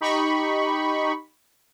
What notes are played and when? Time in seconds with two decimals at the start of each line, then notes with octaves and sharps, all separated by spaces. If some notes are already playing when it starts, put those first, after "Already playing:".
0.01 D#4 G4 B5 C#6